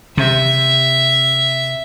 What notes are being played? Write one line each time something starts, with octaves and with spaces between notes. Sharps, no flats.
C3 E5